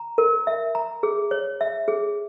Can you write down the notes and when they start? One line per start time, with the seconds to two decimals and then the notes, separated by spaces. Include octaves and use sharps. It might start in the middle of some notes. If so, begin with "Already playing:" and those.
Already playing: A#5
0.18 A#4
0.47 E5
0.75 A#5
1.03 G#4
1.31 C#5
1.61 E5
1.88 G#4